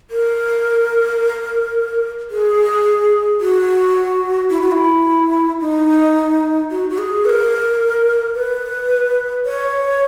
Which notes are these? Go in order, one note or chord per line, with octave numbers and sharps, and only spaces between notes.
A#4
G#4
F#4
E4
F#4
E4
D#4
F#4
F#4
G#4
B4
A#4
B4
C#5